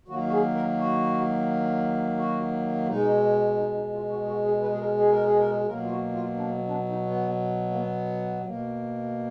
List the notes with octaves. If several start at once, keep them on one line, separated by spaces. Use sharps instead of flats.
D#3 F#3 A#3 F#4
F#4
G#4
A#4
F#4
F#4
B2 G#3 D#4
D#4
D#4
F4
F#4
G#4
F#4
G#4
B4
G#4
A#4
G#4
A#4
G#4
A#4
G#4
B2 F#3 A#3 A#4
F4
F#4
F4
D4
A#3
D4
B3
D#4
B3
A#3
B3
B2 A#3